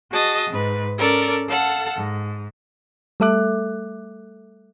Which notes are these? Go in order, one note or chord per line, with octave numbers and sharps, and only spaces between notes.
F#4 G#4 D#5 A5 D#6
G#2 B4
C#4 A4 A#4 D5
A4 F5 F#5 A5
G#2
G3 A3 A4 E5 D6 F#6